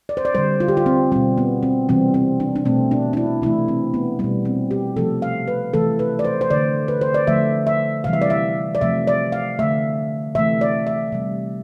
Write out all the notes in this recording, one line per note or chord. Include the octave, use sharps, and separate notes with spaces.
D5
C5
D5
D3 G3 C5
F4
G4
F4
C4
B2 G3 C4
B3
C4
C3 E3 G3 C4
C4
D4
D4
B2 A3 C4
D4
D4
E4
C3 E3 A3 E4
C4
B3
B2 G3 B3
C4
G4
C3 F3 A3 A4
F5
B4
C3 E3 A3 A4
B4
D5
C5
C5
D3 A3 D5
B4
C5
D5
D3 F3 A3 E5
E5
C3 E3 G3 F5
E5
D5
E5
D5
C3 F3 A3 E5
D5
F5
D3 A3 E5
C3 E3 A3 E5
D5
E5
C3 G3